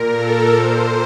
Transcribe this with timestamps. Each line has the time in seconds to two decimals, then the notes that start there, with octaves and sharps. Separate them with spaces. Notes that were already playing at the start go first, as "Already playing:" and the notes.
Already playing: A#2 A#4
0.10 A4
0.53 A#2 C5